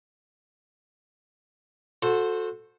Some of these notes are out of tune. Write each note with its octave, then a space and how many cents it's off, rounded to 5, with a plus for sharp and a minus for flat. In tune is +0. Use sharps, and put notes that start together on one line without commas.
F#4 -25 A4 +0 C5 +0